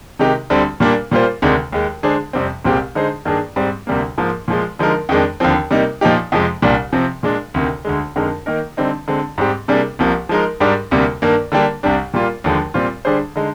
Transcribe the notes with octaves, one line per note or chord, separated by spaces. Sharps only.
C3 D#3 G#3 D#4 G4
D2 D3 G3 C4
A#2 G3 A#3 D4
A#2 G3 A#3 F4 C5
D2 C3 D#3 G#3 D4
D#2 D#3 G#3
D3 G#3 D4 G#4 C5
F2 C3 G3 C4
C2 A#2 G#3 C4 G4
D3 G#3 D#4 G#4 C5
G2 D#3 A#3 D4 G#4
G#2 G3 C4
D2 C3 G3 A#3
G#2 F3 A#3
A#2 F3 G#3
D3 F3 G#3 D#4 A#4
F2 D#3 G#3 D4
D#2 D3 F3 C4
C3 G3 A#3 D#4
A#2 F3 A#3 D#4 G4
F2 C3 F3 G#3
C2 A#2 G3 D4
C3 F3 C4
A#2 G#3 D4
D2 C3 D#3
D2 D3 G#3
F2 D3 G#3 D#4 A#4
D#3 A#3 D#4 A#4
D3 G3 C4 D#4
D3 G#3 C4
G#2 G3 C4 G4
C3 G3 A#3 D4 G#4
C2 C3 F3 A#3
F3 G#3 D#4 A#4
G#2 G3 D4 G4 A#4
D2 C3 G3 A#3
G2 D#3 A#3
D3 G3 A#3 D4 G4
C2 C3 G3 D4
A#2 G3 A#3 F4
D#2 D3 F3 G#3
A#2 G3 C4 F4
D3 G3 D4 G#4 C5
D3 G#3 D#4